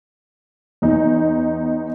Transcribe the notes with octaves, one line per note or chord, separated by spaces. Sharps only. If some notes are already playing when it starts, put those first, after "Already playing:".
E2 D#4